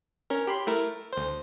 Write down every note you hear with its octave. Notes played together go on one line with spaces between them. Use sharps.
C#4 A#4
G4 B5 C6
A3 E4 A#4
D2 C5